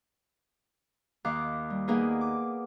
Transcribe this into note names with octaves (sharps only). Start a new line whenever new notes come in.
D#2 D#3 F5 D6 F#6
G3
A#3 B3 D#4 G#4 A#4 B4
D6